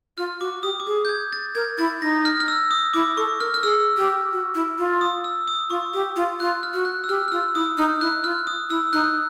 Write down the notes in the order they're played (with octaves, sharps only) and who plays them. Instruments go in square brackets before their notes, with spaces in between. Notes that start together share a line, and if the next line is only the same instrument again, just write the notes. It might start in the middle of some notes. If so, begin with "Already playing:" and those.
[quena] F4 [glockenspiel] F6
[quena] F#4 [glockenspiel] D6
[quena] G4 [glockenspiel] D#6
[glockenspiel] D6
[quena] G#4 [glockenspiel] D#6
[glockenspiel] G6
G#6
A6
[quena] A#4 [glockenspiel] G#6
[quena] E4 [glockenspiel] A6
[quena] D#4 [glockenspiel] A#6
[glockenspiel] F6
F6
E6
D#6
[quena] E4 [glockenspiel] D6
[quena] A4 [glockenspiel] C#6
[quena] A#4 [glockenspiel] F6
[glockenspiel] F6
[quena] G#4 [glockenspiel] E6
[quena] G4
F#4
E4
F4
[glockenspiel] D#6
E6
D#6
[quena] F4 [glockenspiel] C#6
[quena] G4 [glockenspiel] D#6
[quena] F4
[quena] F4 [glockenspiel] F#6
[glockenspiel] F6
[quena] F#4
[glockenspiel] F#6
E6
[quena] G4 [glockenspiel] F6
[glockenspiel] F6
[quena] F4 [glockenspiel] E6
[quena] E4 [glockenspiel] D#6
[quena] D#4 [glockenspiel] F6
[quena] E4 [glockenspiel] F#6
[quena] F4 [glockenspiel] F6
[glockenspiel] D#6
[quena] E4 [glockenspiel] E6
[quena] D#4 [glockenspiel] F#6